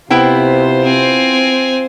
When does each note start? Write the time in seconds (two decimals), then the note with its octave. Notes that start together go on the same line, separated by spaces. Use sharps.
0.10 C3 B3 E4 F4 C5 G5
0.83 C4 G#5